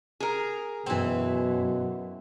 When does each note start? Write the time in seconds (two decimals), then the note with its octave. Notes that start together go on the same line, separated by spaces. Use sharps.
0.20 G#4 A#4
0.86 F#2 B2 E3 C4